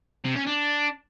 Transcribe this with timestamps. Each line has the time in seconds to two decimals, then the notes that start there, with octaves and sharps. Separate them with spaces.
0.24 C3
0.35 C#4
0.46 D4